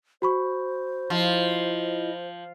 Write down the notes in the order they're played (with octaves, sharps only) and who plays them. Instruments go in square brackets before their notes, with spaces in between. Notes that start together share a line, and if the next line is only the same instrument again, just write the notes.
[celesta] F#4 B5 C#6 [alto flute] C5
[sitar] F3 [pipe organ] E4 F4 D#5